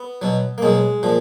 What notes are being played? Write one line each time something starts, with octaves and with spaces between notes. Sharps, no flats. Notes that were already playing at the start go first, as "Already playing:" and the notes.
Already playing: B3
B2 F#3
A#3
B2 F#3 G#3
A#2 F3